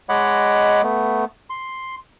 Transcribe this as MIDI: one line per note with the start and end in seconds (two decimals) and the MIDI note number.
0.09 0.82 56
0.09 0.82 73
0.09 0.82 75
0.09 0.82 78
0.09 0.82 83
0.09 0.82 86
0.83 1.25 57
0.83 1.25 59
1.50 1.95 84